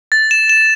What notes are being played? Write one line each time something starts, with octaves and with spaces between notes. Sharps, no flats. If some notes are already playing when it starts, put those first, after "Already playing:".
A6
E7
E7